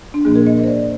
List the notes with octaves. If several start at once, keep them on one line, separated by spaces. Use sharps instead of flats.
D4
A#2 F3 A#3 G#4
A#4
D#5
D#5
C5
D5